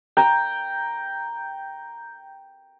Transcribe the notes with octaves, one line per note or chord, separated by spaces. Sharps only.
G5 A#5